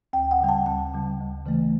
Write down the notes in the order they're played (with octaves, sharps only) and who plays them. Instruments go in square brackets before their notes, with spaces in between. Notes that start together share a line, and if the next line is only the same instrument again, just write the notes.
[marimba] D2 G5
F#5
C#3 G3 G5
A5
D2 A5
C#3 G3
D2
C#3 E3 A3